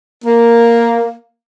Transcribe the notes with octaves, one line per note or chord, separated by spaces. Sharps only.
A#3